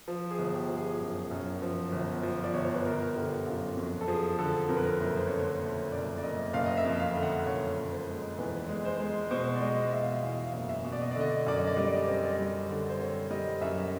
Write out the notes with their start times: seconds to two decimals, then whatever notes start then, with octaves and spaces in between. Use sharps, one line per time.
0.08 F3
0.31 G#4
0.39 G1
0.54 G4
0.69 F3
0.77 G#4
1.00 F#2
1.31 F#2
1.62 F3
1.92 G1
2.23 F3
2.44 D5
2.54 G1 C#5
2.64 C5
2.74 B4
2.85 G1 A#4
3.16 D3 G4
3.46 F#2 F4
3.77 F2 F#4
4.01 A4
4.08 F3 G#4
4.39 D3 A4
4.69 F2 A#4
4.77 B4
4.85 A#4
5.00 F#1
5.16 C5
5.27 D3 C#5
5.39 C5
5.61 F#1 C#5
5.92 F#1 D5
6.18 D5
6.23 F#1 D#5
6.53 F#1 F5
6.66 D#5
6.77 E5
6.85 F2
7.00 F5
7.16 D3
7.23 F#5
7.46 F#1 C#5
7.77 F#1
7.92 C5
8.08 G#3
8.38 E2 B4
8.69 G#3
8.85 C5
9.00 G#3
9.31 B2 C5
9.55 D5
9.62 G#3 D#5
9.92 B2 E5
10.02 F5
10.11 E5
10.23 E2 F5
10.46 F5
10.54 F#1
10.69 E5
10.85 B2
10.92 D5
11.02 D#5
11.11 D3 D5
11.20 D#5
11.30 D5
11.39 D#5
11.46 F#2 D5
11.58 D#5
11.67 D5
11.77 G3 D#5
11.86 D5
11.95 D#5
12.04 C4 D5
12.14 D#5
12.23 D5
12.33 D#5
12.38 G3 D5
12.69 D3
12.89 C5
13.00 C4 C#5
13.31 G3 D#5
13.61 F#2 E5